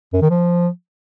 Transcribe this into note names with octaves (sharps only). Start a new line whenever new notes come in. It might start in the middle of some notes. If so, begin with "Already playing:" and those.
F#2
D#3
F3